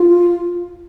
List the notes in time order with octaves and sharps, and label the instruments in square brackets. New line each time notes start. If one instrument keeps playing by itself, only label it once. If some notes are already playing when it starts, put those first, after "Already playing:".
Already playing: [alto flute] F4